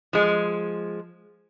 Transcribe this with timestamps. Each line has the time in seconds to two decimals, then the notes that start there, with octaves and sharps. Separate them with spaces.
0.13 F3 G#3